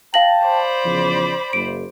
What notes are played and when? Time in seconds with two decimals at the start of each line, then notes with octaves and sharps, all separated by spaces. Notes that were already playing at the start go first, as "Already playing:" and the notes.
0.14 F5 G5 A5 A#6 F#7
0.45 C5 D5 B5
0.85 E2 C#3 F3
1.53 F#1 D7